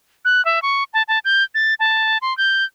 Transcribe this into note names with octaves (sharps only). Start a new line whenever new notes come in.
F#6
E5
C#6
A5
A5
G6
A6
A5
C6
G6